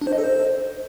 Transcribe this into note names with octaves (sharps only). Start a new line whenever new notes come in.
D4
C5
D#5
A4
C5